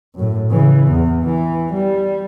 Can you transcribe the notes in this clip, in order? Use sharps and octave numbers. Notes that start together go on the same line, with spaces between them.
F#2 A2
C#3 E3
E2
E3
G3